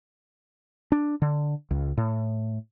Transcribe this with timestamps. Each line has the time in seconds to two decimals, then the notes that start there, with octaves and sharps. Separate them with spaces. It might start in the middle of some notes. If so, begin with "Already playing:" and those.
0.92 D4
1.22 D3
1.71 C#2
1.97 A2